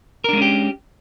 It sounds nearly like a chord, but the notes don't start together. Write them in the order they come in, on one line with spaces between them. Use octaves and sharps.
A#4 D4 G#3 C#4 G4